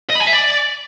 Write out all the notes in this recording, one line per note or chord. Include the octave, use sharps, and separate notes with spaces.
D#5
B5
G#5
E5
D5